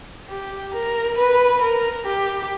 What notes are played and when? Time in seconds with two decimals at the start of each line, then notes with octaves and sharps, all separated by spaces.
0.29 G4
0.74 A#4
1.17 B4
1.61 A#4
2.06 G4